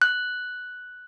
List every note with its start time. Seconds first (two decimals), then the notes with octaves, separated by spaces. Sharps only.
0.02 F#6